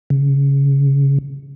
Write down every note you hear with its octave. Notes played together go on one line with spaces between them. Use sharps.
C#3